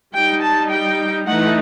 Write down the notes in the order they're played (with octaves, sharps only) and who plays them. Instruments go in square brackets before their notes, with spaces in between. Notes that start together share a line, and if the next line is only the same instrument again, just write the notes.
[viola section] G3 D#4 G5
A5
G5
E3 A3 D#4 F#5